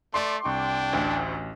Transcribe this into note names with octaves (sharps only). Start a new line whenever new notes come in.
A3 D5 C6 D6
C2 D4 G5 C#6
A1 D2